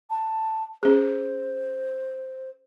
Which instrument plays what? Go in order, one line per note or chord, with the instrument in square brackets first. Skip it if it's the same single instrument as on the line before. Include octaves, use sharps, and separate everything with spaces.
[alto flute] A5
[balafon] C#4 G#4 [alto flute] C5